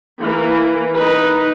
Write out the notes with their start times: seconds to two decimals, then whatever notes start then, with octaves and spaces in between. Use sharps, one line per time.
0.20 E3 A#3
0.94 D#4 B4